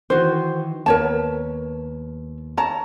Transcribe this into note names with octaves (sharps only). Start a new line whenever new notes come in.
D#3 E3 F#4 C5
D#2 B3 A#4 B4 C#5 A5
C#5 A5 A#5